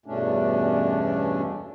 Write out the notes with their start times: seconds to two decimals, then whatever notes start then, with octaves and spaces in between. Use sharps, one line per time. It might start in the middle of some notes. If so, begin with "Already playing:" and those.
0.06 E2 G2 B2 A3 C#4 D4